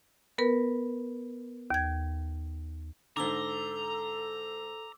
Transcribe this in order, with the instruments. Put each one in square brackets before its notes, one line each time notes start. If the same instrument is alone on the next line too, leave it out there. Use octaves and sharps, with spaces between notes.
[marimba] B3 A#4 B4
D#2 G#6
[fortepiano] G#2 D3 [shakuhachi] A4 [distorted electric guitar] A#5 [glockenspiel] D6 E6 G7